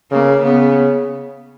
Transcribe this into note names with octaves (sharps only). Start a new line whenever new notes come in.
C#3 A#3
C#3 B3